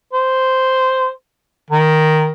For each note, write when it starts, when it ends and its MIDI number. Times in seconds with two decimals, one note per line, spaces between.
0.13 1.09 72
1.70 2.31 51